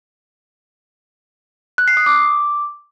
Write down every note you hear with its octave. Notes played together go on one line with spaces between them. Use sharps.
F#6
C7
D#6
D6